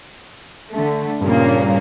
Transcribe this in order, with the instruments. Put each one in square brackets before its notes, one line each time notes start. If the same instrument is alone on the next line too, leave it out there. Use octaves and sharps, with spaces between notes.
[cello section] D3 A3
[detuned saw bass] G2 [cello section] A#2 C#3 A#3